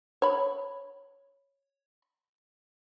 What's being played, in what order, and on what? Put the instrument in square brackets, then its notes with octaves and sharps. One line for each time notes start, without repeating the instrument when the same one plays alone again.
[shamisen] C#5 B5